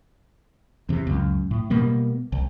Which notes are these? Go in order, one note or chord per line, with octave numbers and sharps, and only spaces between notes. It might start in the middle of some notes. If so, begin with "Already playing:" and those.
E2 C3
C#2 F#2
A2
B2 G3 A#3 B3
C2